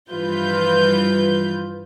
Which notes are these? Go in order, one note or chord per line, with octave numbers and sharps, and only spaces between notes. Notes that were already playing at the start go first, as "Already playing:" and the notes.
G2 E3 F3 F4 B4 G6